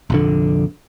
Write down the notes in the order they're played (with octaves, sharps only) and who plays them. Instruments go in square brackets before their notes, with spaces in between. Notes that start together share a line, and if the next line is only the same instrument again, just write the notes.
[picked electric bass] F1 A#1 D3